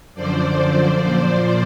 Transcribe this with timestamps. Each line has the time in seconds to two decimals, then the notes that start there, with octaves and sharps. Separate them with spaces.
0.14 F#2 D3 F3 C5 D5
0.99 A#2 F3